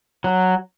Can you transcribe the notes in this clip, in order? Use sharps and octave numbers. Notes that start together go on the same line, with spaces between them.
F#3